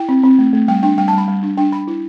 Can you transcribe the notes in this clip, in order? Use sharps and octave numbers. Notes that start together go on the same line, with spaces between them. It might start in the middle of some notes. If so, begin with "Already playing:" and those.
Already playing: E4 G5
C4
C4
A3
A3
G3 G5
D4 G5
G3 G5
A5
G3 B5
G3
D4
D4 G5
D4 B5
E4